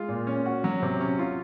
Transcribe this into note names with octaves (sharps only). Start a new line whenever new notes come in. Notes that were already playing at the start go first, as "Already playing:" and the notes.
Already playing: G#3 F4
A#2
C#4
F#4
F#3
C3
C#4
F4